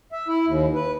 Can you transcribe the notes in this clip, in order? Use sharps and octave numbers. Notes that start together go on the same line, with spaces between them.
E5
E4
D#2
B4